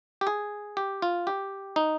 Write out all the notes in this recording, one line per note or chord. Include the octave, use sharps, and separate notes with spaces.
G4
G#4
G4
F4
G4
D#4